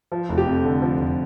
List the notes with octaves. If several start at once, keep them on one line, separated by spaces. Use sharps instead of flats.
F3
F1
G4
F2
D3
F3
F1